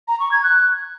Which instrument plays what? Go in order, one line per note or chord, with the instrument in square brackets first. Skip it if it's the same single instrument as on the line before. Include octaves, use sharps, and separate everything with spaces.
[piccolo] A#5
C#6
G#6
F#6